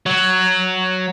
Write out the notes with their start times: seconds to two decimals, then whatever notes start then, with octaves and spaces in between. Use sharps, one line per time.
0.06 F#3